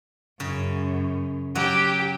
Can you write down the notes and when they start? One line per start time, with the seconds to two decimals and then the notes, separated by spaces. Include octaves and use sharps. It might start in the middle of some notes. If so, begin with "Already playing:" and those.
0.40 F#2 C#3
1.55 F#3 G4